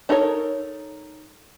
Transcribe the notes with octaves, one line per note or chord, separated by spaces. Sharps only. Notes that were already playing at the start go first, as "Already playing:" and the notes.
D4 D#4 A4 A#4 C#5